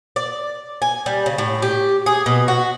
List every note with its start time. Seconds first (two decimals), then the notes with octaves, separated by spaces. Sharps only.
0.16 D5
0.82 G#5
1.06 G3
1.26 C#3
1.38 A2
1.62 G4
2.06 G#4
2.26 B2
2.48 F#4